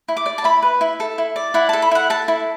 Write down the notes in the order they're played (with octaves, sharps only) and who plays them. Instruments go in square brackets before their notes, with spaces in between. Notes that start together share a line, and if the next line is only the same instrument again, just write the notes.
[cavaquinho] E4
D6
D5
A5
E4 B5
B4
E4
A4
E4
D5
E4 F#5
A4 A5
B5
E4 F#5
A4 A5
E4